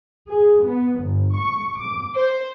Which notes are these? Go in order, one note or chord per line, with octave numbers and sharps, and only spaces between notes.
G#4
B3
G1
C#6
D6
C5